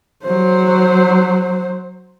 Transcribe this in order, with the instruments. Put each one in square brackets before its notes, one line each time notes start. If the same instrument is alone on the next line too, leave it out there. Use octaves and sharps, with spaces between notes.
[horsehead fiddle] F#3 C5